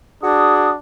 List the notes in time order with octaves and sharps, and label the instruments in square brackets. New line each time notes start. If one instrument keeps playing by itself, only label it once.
[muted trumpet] D4 [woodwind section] F#4 G#4 D#6